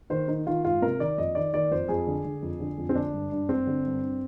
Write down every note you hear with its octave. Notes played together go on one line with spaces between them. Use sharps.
D#3 C5
D#3 D#4
D#3 F4
G#2 F4
C3 A#4
D#3 D5
F2 D#5
D#3 D5
D#3 D5
F2 C5
F2 G#4
D3
D3
F2
D3
F2
C4
D3 D4
G2
G2
G2 C4
D3
G2